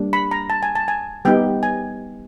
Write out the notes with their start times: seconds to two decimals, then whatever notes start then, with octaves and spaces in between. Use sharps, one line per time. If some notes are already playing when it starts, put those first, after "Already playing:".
Already playing: G3 A#3 D4
0.13 B5
0.31 A#5
0.50 A5
0.63 G#5
0.75 A5
0.88 G#5
1.25 G3 B3 D#4 G4 G5
1.63 G#5